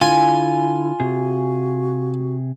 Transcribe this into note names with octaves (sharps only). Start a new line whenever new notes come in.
D3 E4 F4 G#5
C3 F#4 G#4